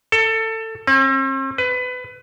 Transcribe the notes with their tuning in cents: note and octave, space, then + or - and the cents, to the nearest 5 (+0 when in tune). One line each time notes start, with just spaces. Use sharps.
A4 +20
C4 +45
B4 +25